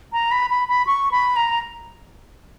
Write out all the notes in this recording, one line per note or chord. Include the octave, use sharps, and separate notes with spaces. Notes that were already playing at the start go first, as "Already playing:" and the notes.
A#5
B5
B5
B5
C#6
B5
A#5